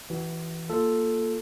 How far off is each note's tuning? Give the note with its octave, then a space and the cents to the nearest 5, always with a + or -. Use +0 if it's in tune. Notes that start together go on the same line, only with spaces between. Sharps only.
E3 +0 F#4 +30
A#3 +0 F4 +0 A4 +0